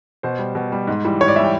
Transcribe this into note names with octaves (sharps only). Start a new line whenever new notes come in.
B2 C5
G3
B2
G3
G#2
E3 G3
G#2 C#5
D5
E3 G3 E5
G5